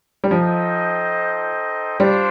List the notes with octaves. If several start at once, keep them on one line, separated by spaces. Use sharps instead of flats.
G3
F3 D#4 A4 C5 D#5 G5
G3 D4 F4 C5